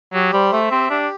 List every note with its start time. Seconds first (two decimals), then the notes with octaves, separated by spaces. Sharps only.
0.13 F#3 G4
0.33 G3 C5
0.52 A3 E5
0.71 C4 G4
0.90 D4 G4